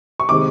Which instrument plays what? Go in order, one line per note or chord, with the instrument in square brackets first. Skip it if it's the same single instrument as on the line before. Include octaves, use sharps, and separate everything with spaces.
[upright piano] C#6
C3 D#3 G#3 C4 D6